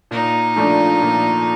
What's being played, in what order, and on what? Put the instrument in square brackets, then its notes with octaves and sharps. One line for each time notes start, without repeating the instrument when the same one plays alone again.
[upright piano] A#2 [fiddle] D#4
[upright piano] F3 A3 D4
A#2